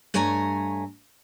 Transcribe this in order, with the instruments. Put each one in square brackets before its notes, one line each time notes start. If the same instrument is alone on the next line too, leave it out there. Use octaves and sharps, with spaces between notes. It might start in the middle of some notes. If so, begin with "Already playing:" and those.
[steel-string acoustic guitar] G2 A3 C#5 G#5 A#5